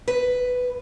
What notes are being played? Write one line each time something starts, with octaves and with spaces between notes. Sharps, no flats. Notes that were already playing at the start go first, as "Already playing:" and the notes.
B4